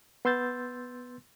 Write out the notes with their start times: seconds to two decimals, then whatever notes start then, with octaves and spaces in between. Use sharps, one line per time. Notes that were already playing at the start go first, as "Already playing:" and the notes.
0.25 B3 C6 E6 G6 A6